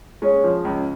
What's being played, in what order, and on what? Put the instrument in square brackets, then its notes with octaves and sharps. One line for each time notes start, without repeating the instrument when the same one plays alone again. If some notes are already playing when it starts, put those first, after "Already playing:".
[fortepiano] G#3 C#4
F3
C#2